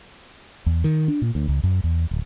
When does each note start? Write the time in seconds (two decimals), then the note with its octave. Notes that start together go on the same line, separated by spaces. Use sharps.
0.66 E2
0.84 D#3
1.08 D4
1.22 A#2
1.35 D2
1.48 C#2
1.64 F#2
1.84 E2
2.11 D1